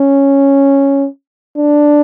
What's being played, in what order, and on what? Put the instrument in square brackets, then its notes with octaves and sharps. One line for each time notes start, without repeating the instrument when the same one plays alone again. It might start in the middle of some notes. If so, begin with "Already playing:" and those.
Already playing: [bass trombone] C#4
D4